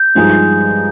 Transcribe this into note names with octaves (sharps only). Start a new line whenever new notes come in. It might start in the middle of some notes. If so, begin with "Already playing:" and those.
Already playing: G6
G2 F3 G#3 D#4